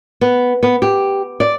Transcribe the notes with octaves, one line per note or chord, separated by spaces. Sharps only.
B3
B3
G4
D5